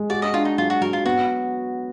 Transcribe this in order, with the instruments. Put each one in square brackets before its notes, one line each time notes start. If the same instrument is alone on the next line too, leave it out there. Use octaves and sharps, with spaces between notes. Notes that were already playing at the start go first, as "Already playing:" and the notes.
Already playing: [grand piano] G#3
[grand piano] F#4 [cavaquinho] D5
[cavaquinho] D#5
[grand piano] D4 [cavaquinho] F4
[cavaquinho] D#4
[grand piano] F#3 [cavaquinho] F4
[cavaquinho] F#4
[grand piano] F#3 [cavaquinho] A#4
[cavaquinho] F4
[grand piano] B3 [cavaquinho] F#4